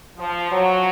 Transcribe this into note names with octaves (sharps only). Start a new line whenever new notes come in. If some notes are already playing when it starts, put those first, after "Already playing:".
F3
F#3